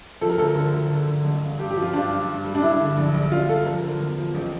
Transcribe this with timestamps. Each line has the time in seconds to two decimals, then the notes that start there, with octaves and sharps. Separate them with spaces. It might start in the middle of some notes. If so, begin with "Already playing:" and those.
0.21 F3 A4
0.30 A#4
0.38 D2 A4
0.55 D3
0.72 D2
0.90 D3
1.07 D3
1.24 A1
1.42 G2
1.59 G2 G4
1.71 G4
1.76 F3
1.82 F4
1.93 G2 D4
2.10 G2
2.28 G2
2.45 G3
2.55 D4
2.62 G3 E4
2.80 G1
2.97 A#1
3.14 A#1
3.32 A#1 F4
3.49 G3 A4
3.66 F3 A#4
3.84 D3
4.00 E2
4.18 F3
4.35 A1